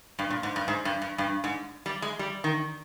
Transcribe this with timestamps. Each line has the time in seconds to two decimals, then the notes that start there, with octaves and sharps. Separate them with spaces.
0.19 G2
0.31 A#2
0.43 G#2
0.56 G2
0.68 G#2
0.85 G2
1.02 G2
1.18 G2
1.44 G#2
1.86 G3
2.02 G#3
2.19 G3
2.44 D#3